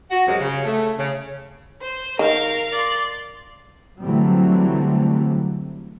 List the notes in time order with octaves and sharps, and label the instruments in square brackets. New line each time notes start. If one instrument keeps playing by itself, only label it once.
[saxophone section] F#4
F#2 C3 F#3 G#3
C#3
A3
C#3
[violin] C5
[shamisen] D#3 [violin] A#4 F5
[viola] D5 C6
[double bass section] D3 E3 F#3 G3 A3 C4